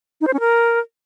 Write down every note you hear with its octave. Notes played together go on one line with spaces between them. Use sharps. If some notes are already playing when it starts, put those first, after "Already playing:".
D#4
C5
C#4
A#4